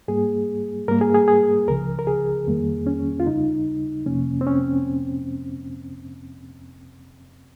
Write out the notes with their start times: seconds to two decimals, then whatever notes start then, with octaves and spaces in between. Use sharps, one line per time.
0.08 G#2 G3 A#3 G#4
0.88 G#2 G3 A#3 A#4
1.01 G#4
1.15 G#4
1.28 G#4
1.68 C#2 C#3 F3 A#4
1.99 A#4
2.07 G#4
2.47 F2 D#3 G3 A#3
2.87 C#4
3.20 F4
3.26 D#2 C#3 G3 D#4
4.06 F2 C3 F3 A#3 C#4
4.41 C4
4.47 C#4